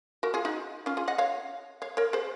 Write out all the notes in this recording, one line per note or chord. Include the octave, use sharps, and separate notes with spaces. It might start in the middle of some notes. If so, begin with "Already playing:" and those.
F#4 A#4
F4 G#4
D#4 F#4
C#4 F4
F4 G#4
D#5 F#5
C#5 F5
C#5 F5
A#4 C#5
G#4 C5